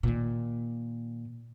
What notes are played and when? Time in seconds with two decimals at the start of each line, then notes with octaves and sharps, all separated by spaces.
0.03 A#2 D#3